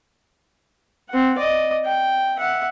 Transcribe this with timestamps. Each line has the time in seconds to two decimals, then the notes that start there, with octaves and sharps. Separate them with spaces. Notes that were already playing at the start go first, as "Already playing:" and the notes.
1.09 C4 F#5
1.39 D5 D#5
1.85 G5
2.38 E5 F#5